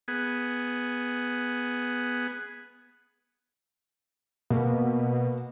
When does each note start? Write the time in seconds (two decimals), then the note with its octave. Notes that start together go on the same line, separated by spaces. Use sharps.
0.08 B3 G#4
4.50 B2 A#3